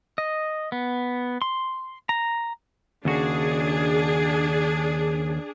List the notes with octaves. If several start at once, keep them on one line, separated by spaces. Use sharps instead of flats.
D#5
B3
C6
A#5
D#2 C#3 D4 F#4 G#4